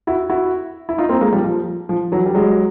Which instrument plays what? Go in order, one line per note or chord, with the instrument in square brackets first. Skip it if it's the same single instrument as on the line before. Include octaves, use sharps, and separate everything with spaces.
[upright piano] E4 F#4
E4 F#4
E4
D#4 F4
A#3 C4
G#3 A#3
F3 G3
F3
F3
E3 F#3
G3
F#3 G#3